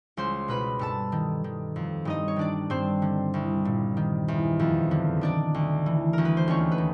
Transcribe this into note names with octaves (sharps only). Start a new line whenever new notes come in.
C#2 C5 C6
B2 B4 B5
G2 A4 A5
D#3
D#3
F2
G2 D#4 D#5
C#5
D#3 D4 D5
G2 C4 C5
D3
C2
A#2
D#3
E2
F2
D3
D#3 D4 D5
D2
E3
D2 A#4
B4
C5
D#2 C#4 C#5
B4
D#3